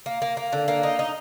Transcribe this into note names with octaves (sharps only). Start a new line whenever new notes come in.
A#3
A#3
A#3
D3
A#3
D#4
D#4